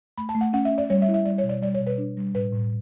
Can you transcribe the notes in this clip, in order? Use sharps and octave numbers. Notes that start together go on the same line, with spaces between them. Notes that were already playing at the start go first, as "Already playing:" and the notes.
A3 B5
A5
A3
F#5
C#4 F#5
E5
C#4
D5
G3 C#5
E5
E4
E5
G3 D5
C#5
B2
D5
G3 D5
C#5
B2
B4
D4
G3
A2 B4
A2